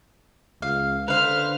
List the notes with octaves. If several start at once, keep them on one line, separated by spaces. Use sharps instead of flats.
C#2 F5
D3 B4 C5 F5 F6